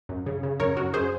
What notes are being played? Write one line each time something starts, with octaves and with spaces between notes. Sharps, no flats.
F#2
C#3
C#3
F#2 A#4 C#5
F#2 F#4 A#4
F#2 G#4 C5